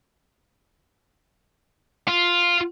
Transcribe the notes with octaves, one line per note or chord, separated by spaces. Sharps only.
F4